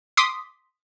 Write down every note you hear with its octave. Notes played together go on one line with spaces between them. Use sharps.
C6 D6 D#6 B6